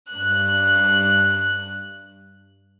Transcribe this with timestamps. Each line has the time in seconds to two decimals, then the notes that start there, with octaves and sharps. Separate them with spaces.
0.11 G2 F#6